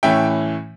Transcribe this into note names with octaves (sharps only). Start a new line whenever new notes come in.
A2 E3 A3 C#4 E5 G5